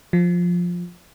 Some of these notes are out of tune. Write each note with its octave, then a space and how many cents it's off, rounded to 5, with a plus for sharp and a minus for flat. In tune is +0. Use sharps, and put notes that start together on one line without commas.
F3 +10